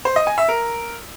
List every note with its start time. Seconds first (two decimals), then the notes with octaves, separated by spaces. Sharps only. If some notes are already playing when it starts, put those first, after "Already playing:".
0.05 C5
0.16 D#5
0.27 G#5
0.38 E5
0.48 A#4